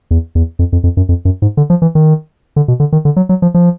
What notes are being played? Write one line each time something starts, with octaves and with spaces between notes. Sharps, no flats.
E2
E2
F2
F2
F2
F#2
F2
F#2
G#2
D3
F3
E3
D#3
D3
B2
D3
D#3
D3
F#3
F#3
F3
F3